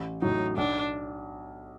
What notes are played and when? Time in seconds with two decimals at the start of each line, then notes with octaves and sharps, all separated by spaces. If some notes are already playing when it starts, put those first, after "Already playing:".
Already playing: A1
0.22 A2 F#3 D#4
0.57 B1 D4